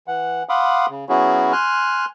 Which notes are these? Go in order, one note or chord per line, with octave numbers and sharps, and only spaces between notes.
E3 F#5
F5 F#5 B5 C6 D6 D#6
C#3
F#3 B3 C#4 E4 F#4 G#4
G#5 C6 F6 F#6